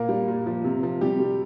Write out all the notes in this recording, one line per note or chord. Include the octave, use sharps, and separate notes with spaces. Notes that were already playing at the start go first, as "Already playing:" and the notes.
Already playing: A#2 A#3 A#4
G3
A#2
F3
C3
F3
C3 G3 G4
G3